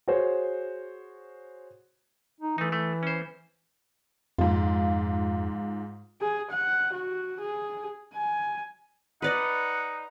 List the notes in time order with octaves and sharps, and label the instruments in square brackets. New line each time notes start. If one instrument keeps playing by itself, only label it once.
[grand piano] F#4 G#4 C5 C#5
[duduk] D#4
[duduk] E3 [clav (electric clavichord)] A3 D#4
[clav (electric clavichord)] A3
C#4 C5
[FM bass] F2 [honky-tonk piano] G#2 F4
[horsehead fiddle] G#4
F#5
F#4
G#4
G#5
[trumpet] D#4 [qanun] B4 D5 D#5 [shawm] F#5